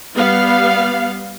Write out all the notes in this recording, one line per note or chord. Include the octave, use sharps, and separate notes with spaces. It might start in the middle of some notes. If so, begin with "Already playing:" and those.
G3 B3 F5